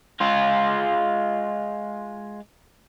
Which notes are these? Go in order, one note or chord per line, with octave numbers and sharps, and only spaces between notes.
G#3 F4